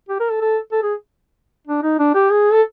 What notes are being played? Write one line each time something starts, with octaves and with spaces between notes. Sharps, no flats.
G4
A#4
A4
A4
A4
G#4
D4
D#4
D4
G4
G#4
A4